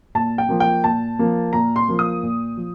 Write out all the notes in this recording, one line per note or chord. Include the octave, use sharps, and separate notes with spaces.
A#2 A5
G5
F3 A#3
G5
A#2 A5
F3 A#3
A#2 A#5
C6
F3 A#3
D#6
A#2
F3